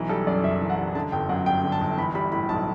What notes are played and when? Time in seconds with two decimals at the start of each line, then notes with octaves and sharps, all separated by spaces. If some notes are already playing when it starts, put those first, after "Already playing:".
Already playing: B1 E3
0.09 G3 A4
0.27 F#2 D5
0.44 F#1 E5
0.61 E3
0.70 F#5
0.78 G3
0.95 D3 A5
1.12 G1 G5
1.29 F#2 F#5
1.46 G1 G5
1.63 D3
1.72 A5
1.81 G1
1.98 E3 B5
2.15 G3 B5
2.32 A2 B5
2.49 B1 A5